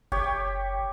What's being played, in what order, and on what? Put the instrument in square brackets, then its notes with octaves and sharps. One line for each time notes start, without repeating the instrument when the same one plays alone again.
[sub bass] F#1 [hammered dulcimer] G4 C#5